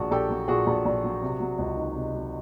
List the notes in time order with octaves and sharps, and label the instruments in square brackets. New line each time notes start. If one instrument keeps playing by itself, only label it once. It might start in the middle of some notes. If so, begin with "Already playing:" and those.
Already playing: [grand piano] A#1 A#2 F#4 G#4
A#1 G4 A4
F#3
A#2 F#4 G#4
A#1
A#1
F#3
C3
F#3
C#2
D#3
C3
F#3